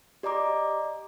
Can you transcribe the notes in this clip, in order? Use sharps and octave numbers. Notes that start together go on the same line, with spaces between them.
G4 D5 D#5 A#5 D6